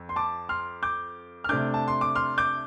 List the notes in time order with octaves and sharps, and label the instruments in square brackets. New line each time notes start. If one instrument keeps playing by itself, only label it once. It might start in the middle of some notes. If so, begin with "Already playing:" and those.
Already playing: [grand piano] F2
C6
A5 D6
C6 F6
D6 G6
F6
C3 A3 D4 D6 G6
A5
C6
D6
C6 F6
D6 G6